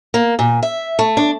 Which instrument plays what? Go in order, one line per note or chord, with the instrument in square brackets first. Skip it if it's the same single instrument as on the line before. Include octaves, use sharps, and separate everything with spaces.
[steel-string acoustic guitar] A#3
A#2
E5
A3
D4